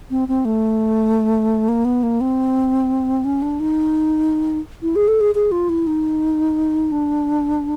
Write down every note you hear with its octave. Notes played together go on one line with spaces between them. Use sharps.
C4
C4
A3
A#3
B3
A#3
C4
C#4
D4
D#4
E4
G#4
A4
G#4
G#4
F4
E4
D#4
D4